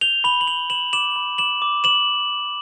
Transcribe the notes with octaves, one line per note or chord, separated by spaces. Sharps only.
G6 F7 G7
B5 F7 G7
F#7
B5 F7 G7
B5 E7 F#7
D6 E7 F#7
B5
D6 E7 F#7
D6
D6 E7 F#7